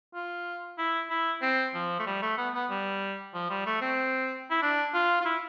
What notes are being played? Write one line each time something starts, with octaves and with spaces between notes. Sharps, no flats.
F4
E4
E4
C4
F3
A3
G3
A3
B3
B3
G3
F3
G3
A3
C4
E4
D4
F4
F4
E4